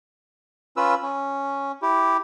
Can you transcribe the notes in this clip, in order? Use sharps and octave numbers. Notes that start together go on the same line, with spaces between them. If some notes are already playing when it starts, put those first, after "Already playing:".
C#4 F4 B4 E6
C#4
E4 G4